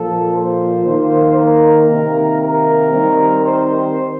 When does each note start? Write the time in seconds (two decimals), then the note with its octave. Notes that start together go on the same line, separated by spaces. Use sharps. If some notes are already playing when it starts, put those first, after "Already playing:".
Already playing: A#2 F3 A#3 A4
0.34 C5
0.86 D#3 A#3
1.37 A#4
1.89 C3 D#3 A#3
2.40 A#4
2.92 D#3 G3 C4
3.44 C5